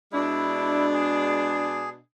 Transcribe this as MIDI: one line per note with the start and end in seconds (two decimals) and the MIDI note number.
0.13 1.97 47
0.13 1.97 56
0.13 1.97 62
0.13 0.86 64
0.93 1.89 68